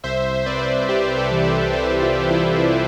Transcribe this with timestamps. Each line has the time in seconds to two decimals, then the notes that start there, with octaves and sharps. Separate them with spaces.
0.04 C2 C5 E5
0.46 C3 B4 D5
0.88 C2 G4 B4
1.17 A4 C5
1.32 E3
1.45 B4 D5
1.73 C2 A4 C5
2.02 F4 A4
2.16 C3
2.31 E4 G4
2.59 C2 E4 G4